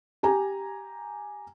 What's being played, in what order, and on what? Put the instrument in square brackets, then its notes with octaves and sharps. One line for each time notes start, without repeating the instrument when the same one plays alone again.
[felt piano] G4 G#5 A#5